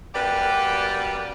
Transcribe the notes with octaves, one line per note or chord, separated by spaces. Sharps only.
F#2 G3 A#3 G4 B4 D5